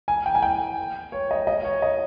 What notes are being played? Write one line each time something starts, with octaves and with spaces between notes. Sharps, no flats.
G#5
G5
G#5
G5
C#5
D#5
D#5
C#5
D#5